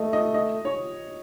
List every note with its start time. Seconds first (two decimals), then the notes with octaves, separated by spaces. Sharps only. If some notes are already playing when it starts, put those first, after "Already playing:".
Already playing: A3 D#5
0.13 D#5
0.34 D#5
0.65 C#5